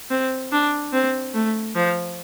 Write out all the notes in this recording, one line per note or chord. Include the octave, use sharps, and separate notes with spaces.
C4
D4
C4
A3
F3